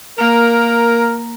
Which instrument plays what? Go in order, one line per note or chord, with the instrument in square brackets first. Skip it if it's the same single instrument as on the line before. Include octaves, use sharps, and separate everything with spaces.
[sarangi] A#3 [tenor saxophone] A#4